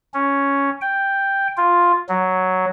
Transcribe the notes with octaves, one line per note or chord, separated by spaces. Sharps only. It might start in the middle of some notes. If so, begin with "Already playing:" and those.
C#4
G5
F4
F#3